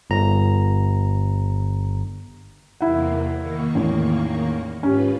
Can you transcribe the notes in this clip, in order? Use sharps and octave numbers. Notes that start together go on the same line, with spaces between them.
G1 A#5
E2 C3 A#3 E4 F#5
D#3 A#3 C#6
A1 E2
G#2 C#4 F4 G4 B4